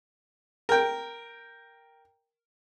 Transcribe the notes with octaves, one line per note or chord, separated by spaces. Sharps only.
A#4 G5